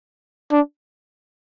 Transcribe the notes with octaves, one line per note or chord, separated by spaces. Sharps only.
D4